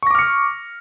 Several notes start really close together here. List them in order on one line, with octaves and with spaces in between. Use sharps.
C#6 A#6 D6 F6 C#7